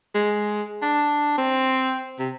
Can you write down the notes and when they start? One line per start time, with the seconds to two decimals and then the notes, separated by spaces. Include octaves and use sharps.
0.15 G#3
0.82 D4
1.38 C4
2.19 C3